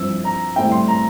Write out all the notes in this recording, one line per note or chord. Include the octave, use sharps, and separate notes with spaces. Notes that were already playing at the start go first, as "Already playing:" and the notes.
Already playing: G2 F3 C4 E4 E6
A#5
A2 G3 C4 E4 G5
C6
A#5